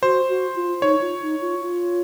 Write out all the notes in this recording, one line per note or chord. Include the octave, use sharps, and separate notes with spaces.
F#4 C5
F#4
F4
D#4 C#5
F4
D#4
F4
F4